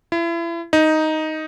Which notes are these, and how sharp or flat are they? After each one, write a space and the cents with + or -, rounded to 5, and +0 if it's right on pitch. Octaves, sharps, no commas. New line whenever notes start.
E4 +35
D#4 +5